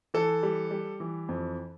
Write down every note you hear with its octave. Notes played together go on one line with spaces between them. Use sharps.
E3 A4
G3
G3
E3
F2